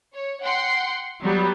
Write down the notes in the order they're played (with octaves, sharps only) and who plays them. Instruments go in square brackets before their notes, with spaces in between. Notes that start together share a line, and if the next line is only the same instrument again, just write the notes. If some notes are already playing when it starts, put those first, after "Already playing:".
[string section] C#5
F#5 G5 C6
F#3 G3 B3